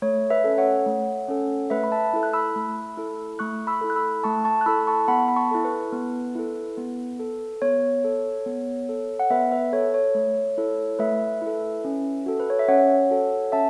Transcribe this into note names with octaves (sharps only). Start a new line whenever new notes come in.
A3 C#5
B4 E5
C#4 A4
C#5 F#5
A3
C#4 A4
A3 B4 E5
B5
E5 A5
E4 A4
F#6
B5 E6
A3
E4 A4
A3 C#6 F#6
B5 E6
E4 A4
F#6
B5 E6
A3 A5 C#6
A5 C#6
F#6
E4 A4 B5 E6
A5 C#6
B3 F#5 B5
B5
A5 C#6
E4 A4
B4
B3
E4 A4
B3
A4
B3 C#5
A4
B3
A4
F#5
B3 B4 E5
B4 E5
A4 C#5
C#5
A3
E4 A4
A3 B4 E5
E4 A4
C#4
F#4 A4
B4
C#5
E5
C#4 C#5 F#5
F#4 A4
C#4 E5 A5